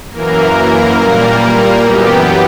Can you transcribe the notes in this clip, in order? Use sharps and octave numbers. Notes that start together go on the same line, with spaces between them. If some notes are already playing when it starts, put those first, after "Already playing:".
F#2 E3 A#3 A#4
A#2 G3 A#3
F#2 E3 B3 G4